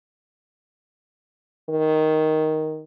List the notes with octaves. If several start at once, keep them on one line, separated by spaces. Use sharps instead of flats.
D#3